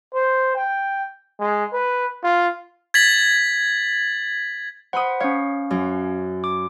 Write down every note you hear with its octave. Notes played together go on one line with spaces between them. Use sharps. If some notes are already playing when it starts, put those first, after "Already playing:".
C5
G5
G#3
B4
F4
G#6 A6 B6 F#7
C5 F#5 B5 D#6
C#4 C#5 F5
F#2
D6